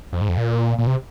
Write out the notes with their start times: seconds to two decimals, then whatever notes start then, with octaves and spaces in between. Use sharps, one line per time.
0.13 F2
0.21 G#2
0.29 F2
0.37 A#2
0.78 A#2
0.87 C3